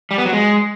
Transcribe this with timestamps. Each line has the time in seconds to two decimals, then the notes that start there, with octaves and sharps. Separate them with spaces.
0.11 G3
0.18 B3
0.25 F#3
0.33 G#3